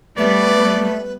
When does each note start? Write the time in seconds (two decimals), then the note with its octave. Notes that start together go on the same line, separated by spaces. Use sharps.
0.18 G3 A3 B3 B4 D5